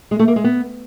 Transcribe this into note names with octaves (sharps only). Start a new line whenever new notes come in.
G#3
A3
A#3
G#3
B3